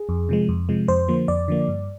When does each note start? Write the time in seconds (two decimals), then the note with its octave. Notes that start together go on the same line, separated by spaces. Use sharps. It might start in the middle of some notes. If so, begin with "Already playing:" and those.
Already playing: G#4
0.09 F2
0.29 C3 F3 G#3
0.49 F2
0.69 C3 F3 G#3
0.88 F2 C5
1.08 D3 F3 A#3
1.28 F2 D5
1.48 D3 F3 A#3
1.68 G2